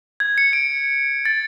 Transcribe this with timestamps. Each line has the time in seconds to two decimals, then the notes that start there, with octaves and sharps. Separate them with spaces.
0.20 G#6
0.38 C#7
0.53 D7
1.25 A6